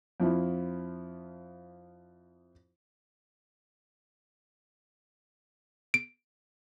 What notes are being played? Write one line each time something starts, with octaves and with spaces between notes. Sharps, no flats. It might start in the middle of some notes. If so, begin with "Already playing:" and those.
F2 F3 E4
D7